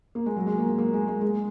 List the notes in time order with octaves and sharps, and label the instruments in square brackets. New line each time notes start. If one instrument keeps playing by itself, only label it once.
[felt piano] A#3
G#3
F#3
G#3
A#3
A#3
A#3
G#3
G#3
G#3